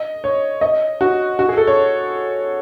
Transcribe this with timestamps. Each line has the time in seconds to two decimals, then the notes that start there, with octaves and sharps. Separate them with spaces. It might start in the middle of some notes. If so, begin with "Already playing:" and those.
Already playing: D#5
0.24 C#5
0.61 D#5
1.01 F#4
1.39 F#4
1.49 G#4
1.57 A4
1.67 C#5